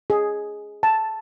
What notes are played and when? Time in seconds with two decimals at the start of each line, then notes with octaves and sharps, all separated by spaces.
0.10 G#4
0.83 A5